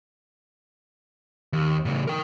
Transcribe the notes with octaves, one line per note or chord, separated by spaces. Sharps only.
D#2
A2 C#3
A#4 G5